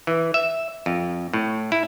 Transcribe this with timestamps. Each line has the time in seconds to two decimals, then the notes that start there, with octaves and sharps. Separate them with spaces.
0.07 E3
0.34 E5
0.86 F2
1.34 A2
1.72 E4